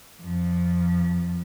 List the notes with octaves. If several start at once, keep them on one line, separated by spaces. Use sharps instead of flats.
F2 F3